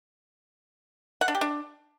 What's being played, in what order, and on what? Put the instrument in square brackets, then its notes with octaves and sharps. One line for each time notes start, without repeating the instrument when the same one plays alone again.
[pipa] F#5
D4
G4
D4